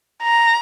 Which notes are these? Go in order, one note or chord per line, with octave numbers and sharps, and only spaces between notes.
A#5